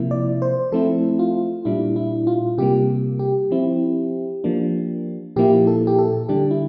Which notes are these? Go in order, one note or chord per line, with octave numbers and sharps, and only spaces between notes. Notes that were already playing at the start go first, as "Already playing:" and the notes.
Already playing: C3 F3 A#3 E4
D5
C5
F3 A3 C4 E4 A4
F4
A#2 G3 D4 E4
E4
F4
C3 G3 A#3 G4
G4
F3 C4 E4
F3 A#3 D4
A#2 F3 A#3 E4 G4
A4
G4
A4
D3 G3 D4 G4
E4